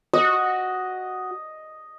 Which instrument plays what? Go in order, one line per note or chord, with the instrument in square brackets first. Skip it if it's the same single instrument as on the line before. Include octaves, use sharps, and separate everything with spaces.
[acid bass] F#4 [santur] D#5